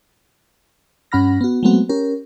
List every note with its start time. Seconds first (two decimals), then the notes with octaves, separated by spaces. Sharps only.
1.12 G2 C#4 F#5 B5 F6 A#6
1.41 B3 F#4
1.63 F#3 G#3 A3 B3 C4 F#4
1.89 C#4 G4 A#4